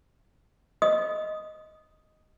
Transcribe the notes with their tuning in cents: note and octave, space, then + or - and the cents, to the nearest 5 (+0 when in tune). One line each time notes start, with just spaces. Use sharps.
D#5 +0 D#6 +0